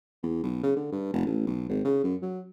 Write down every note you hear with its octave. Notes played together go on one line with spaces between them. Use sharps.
E2
B1
C#3
D3
G2
F1
A1
B1
G#1
C#3
F#2
F#3